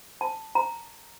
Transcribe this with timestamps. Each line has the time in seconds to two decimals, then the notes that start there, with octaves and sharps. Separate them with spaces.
0.21 A5
0.55 A#5